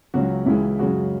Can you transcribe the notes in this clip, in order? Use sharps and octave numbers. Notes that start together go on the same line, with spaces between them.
C#2 C#3 F#3 F#4
C#2 C#3 E3 G#3 E4
F#2 C#3 G#3 F#4